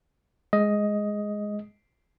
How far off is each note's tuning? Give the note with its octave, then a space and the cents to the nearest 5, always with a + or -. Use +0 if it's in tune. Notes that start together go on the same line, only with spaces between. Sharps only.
G#3 +0 D#5 +10